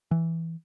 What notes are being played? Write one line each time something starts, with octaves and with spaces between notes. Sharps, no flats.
E3